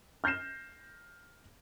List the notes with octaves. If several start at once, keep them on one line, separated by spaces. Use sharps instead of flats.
F6 G6 A#6 C7 E7